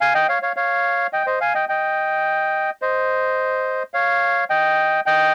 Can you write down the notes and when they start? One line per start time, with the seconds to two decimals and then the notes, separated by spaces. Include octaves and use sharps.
0.01 F5 G#5
0.14 D#5 G5
0.29 C#5 F5
0.42 C#5 F5
0.56 C#5 F5
1.13 D#5 G5
1.26 C5 D#5
1.40 F5 G#5
1.55 D#5 G5
1.69 D#5 G5
2.82 C5 D#5
3.94 C#5 F5
4.50 D#5 G5
5.06 D#5 G5